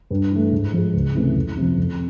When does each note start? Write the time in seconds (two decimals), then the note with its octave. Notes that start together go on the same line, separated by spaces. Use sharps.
0.11 G2
0.31 E3 A3
0.52 G#2
0.73 F3 G#3
0.94 C#2
1.15 C3 E3 A3 C#4
1.36 F2
1.57 C3 F3
1.78 F2